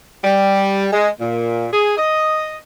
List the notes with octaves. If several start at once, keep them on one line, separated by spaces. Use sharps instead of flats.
G3
G#3
A#2
G#4
D#5